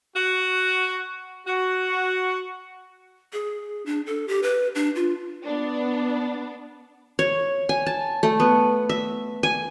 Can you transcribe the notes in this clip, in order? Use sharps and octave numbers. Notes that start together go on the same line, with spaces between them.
F#4
F#4
G#4
D4
A4
G4
B4
D4
F4
B3 D4
C#5
G#5
A5
A3
B3
E5
G#5